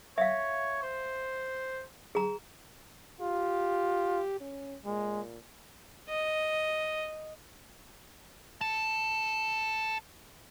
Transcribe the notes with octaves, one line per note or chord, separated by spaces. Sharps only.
C#5 E5 F5
C5
G#4 A#5
F4 G4
C#4
A#2 G#3
D#5
A4 A5